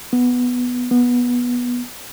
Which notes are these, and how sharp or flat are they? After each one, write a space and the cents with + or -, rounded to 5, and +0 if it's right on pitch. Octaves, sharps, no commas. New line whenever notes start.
B3 +0
B3 -15